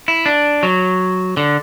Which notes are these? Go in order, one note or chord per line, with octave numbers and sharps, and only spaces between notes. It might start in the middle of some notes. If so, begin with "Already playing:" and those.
E4
D4
F#3
D3